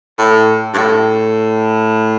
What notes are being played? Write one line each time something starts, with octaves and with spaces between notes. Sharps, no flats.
A2
G2
A2